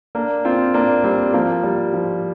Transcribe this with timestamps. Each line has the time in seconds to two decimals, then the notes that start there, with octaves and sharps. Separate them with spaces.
0.15 A#3 D4
0.45 C4 F4
0.74 A#3 D4
1.04 G3 C4
1.33 F3 A#3
1.63 G3
1.93 F3